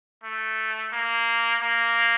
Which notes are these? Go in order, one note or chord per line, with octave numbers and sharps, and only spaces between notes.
A3
A#3
A#3